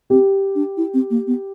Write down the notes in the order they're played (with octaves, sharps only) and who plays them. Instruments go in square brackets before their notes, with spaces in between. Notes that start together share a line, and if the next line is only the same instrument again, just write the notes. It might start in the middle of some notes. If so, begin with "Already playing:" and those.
[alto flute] C4 [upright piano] G4
[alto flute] D4
E4
C4
A#3
B3